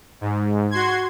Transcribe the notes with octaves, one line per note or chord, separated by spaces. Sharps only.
G#2
F#4 C6 G#6